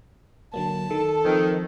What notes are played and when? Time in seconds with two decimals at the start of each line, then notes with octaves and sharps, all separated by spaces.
0.54 D3 F#3 A#3 A5
0.90 D#3 A4
1.25 D#3 F3 C4